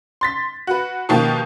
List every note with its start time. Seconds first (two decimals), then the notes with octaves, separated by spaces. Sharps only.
0.21 C6 A6 B6
0.67 F#4 B4
1.09 B2 D#3 F3 A#3 G4